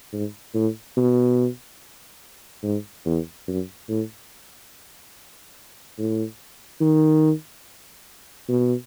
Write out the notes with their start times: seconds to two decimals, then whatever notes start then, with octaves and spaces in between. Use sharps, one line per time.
0.12 G#2
0.54 A2
0.97 B2
2.63 G#2
3.05 E2
3.48 F#2
3.89 A2
5.98 A2
6.81 D#3
8.49 B2